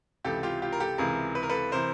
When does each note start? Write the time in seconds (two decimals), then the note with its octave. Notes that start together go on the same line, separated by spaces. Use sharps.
0.24 C#2 C3 E3 G4 A4
0.43 F4 G4
0.62 F4 G4
0.72 A#4
0.80 G4 A4
0.98 C#2 C3 E3 G#4 A#4
1.35 B4
1.43 A#4
1.50 A4 B4
1.72 C3 E3 A#4 C5